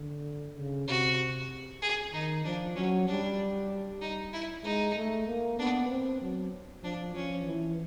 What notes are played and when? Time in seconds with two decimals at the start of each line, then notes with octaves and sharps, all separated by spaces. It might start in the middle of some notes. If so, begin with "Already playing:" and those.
Already playing: D3
0.57 C#3
0.88 C3 F#4
1.82 G#4
2.13 D#3 D#4
2.44 F3 D4
2.76 F#3 C#4
3.07 G3 D4
4.01 D#4
4.33 E4
4.64 G#3 D#4
4.95 A3
5.27 A#3
5.59 B3 D4
5.89 C4
6.21 F#3
6.83 F3 D4
7.15 F3 C#4
7.46 E3